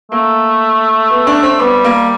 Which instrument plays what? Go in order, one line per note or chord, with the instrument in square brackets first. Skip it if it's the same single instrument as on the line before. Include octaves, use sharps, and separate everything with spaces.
[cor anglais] A3 [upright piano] A#3
[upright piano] B3
D4
C4
[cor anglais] G3 [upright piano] B3
[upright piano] A#3